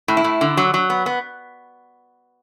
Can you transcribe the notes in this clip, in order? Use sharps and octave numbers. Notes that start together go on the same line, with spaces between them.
A2
E4
A2
D3
F#3
F#3
B3
B3